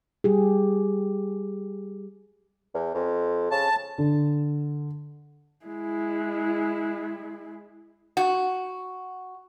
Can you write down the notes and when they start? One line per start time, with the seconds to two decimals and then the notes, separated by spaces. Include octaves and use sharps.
0.24 G3 G4 G#4
2.74 E2
2.94 F2
3.51 C#3 A5
3.98 D3
5.66 G#3 E4
8.17 F#4